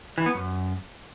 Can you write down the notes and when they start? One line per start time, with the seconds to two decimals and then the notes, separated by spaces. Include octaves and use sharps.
0.18 E3
0.26 B3
0.34 F#2